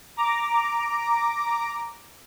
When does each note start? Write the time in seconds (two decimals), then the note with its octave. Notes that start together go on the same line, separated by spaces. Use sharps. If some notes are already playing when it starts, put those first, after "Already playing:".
0.17 A#5 D6